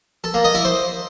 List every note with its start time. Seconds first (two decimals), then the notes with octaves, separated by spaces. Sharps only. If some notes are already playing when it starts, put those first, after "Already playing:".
0.24 A4
0.34 A#3
0.44 D#5
0.54 E4
0.65 C5